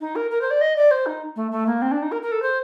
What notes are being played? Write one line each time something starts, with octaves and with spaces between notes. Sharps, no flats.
D#4
A#4
A#4
C5
D5
D#5
D5
C5
D#4
A3
A3
A#3
C4
D4
D#4
A#4
A#4
A4
C5